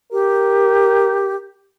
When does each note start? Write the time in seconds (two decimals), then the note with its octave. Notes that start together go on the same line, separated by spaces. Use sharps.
0.12 G4 A#4